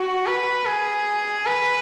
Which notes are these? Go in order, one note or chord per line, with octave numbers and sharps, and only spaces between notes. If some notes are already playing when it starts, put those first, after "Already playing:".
Already playing: F#4
B4
G#4
B4